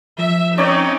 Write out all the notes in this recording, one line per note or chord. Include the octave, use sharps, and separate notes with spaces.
F3 E5
C4 C#4 D#4 C#5 D5